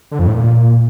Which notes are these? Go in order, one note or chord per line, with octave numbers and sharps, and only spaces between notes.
D3
F2
A2
A#2